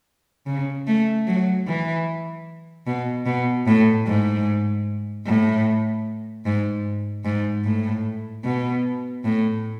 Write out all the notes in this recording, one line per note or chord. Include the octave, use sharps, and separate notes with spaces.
C#3
A3
F#3
E3
B2
B2
A2
G#2
A2
G#2
G#2
A2
B2
A2